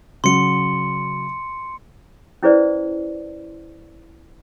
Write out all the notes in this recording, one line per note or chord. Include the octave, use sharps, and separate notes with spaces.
C#3 F#3 C6 C#7
C#4 E4 G#4 B4 C5 D5